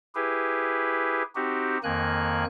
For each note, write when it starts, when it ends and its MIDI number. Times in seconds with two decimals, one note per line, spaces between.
0.15 1.23 64
0.15 1.23 67
0.15 1.23 68
0.15 1.23 71
1.35 1.78 60
1.35 1.78 63
1.35 1.78 66
1.35 1.78 67
1.84 2.44 41
1.84 2.44 51
1.84 2.44 58
1.84 2.44 80
1.84 2.44 90